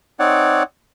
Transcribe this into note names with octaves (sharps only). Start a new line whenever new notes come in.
C4 D#4 C#5 D5 F#5